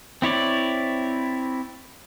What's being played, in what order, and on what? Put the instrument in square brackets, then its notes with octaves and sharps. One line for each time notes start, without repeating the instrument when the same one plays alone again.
[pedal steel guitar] C4 E4 C#5 D5